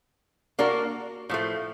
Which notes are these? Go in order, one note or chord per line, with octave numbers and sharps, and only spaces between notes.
A#3 D4 F#4 A#4
A2 F3 A3